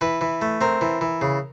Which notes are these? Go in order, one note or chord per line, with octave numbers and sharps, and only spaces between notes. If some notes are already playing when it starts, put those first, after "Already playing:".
E3 B4
E3
A3
C4 A#4
E3
E3
C#3